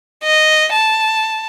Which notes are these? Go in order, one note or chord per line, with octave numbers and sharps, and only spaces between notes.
D#5
A5